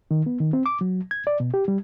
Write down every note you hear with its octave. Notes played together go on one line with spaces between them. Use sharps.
D#3
B3
D#3
C4
D6
F#3
G#6
D5
B2
G4
G3